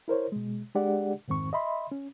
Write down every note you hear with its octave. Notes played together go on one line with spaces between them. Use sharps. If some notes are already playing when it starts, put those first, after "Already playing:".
E4 A#4 C5 C#5
B2 G#3
G#3 D4 G4 G#4 D5 F#5
F2 G#2 D#3 C4 C#6
D#5 E5 B5 C6
C#4